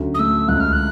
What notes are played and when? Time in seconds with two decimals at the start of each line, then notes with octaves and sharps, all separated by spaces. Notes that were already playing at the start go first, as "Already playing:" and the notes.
Already playing: D2 F#3 C#4
0.14 D#6
0.19 A3 E6
0.48 C#2 F#6
0.60 F6
0.73 F#6